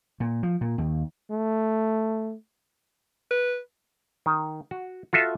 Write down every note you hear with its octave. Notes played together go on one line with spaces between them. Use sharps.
A#2
F3
A#2
D#2
A3
B4
D#3
F#4
F4 F#4 A4 E5